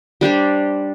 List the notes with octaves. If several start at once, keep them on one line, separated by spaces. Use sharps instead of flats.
G3 D4 G4 C5